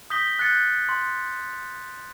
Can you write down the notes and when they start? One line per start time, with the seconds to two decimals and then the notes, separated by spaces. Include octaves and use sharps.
0.10 D#6 G6 A#6 B6 G7
0.39 F#6 G6 A6 C#7
0.89 C6